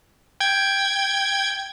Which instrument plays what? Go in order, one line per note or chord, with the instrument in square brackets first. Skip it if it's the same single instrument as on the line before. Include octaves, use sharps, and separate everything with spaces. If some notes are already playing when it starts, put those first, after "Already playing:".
[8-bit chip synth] G5 G#6